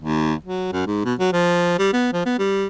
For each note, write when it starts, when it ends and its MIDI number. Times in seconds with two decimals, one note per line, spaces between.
0.01 0.34 39
0.45 0.68 54
0.72 0.81 42
0.86 1.01 44
1.05 1.14 47
1.19 1.31 54
1.32 1.75 53
1.78 1.92 55
1.93 2.11 59
2.13 2.21 53
2.26 2.34 59
2.39 2.66 55